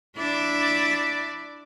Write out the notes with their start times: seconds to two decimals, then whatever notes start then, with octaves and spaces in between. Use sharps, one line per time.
0.17 D4 E4 D5